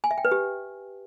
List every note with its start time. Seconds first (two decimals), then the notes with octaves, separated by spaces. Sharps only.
0.04 G#5
0.11 E5
0.18 G5
0.25 B4
0.32 G4